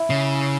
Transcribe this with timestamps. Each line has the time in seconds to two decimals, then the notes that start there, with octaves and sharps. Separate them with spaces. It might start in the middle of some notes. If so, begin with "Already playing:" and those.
Already playing: E4
0.10 C#3